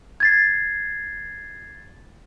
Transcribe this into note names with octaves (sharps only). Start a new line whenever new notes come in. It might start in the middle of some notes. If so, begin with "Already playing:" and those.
G#6 A6 C7